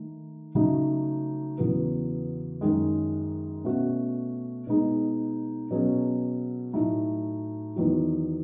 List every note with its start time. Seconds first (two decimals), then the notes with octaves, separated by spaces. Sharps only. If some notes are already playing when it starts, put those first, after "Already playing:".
Already playing: D#3 A3 D#4
0.55 C#3 F#3 A3 D#4
1.58 E2 C#3 F#3 B3
2.61 F#2 D#3 G#3
3.64 B2 A3 C#4 F#4
4.67 B2 G#3 D#4 G#4
5.71 B2 F#3 C#4 G#4
6.73 A2 F#3 A3 D#4
7.76 E2 D#3 F#3